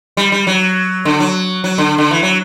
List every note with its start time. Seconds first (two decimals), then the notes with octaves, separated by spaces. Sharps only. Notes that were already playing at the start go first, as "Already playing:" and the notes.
0.17 G3
0.32 G3
0.47 F#3
1.05 D3
1.20 F#3
1.64 F#3
1.78 D3
1.98 D3
2.11 E3
2.23 F#3